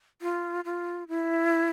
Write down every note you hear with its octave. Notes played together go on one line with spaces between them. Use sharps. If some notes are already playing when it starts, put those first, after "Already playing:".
F4
F4
E4